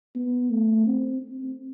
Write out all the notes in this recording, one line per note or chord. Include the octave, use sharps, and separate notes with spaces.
B3
A3
C4
C4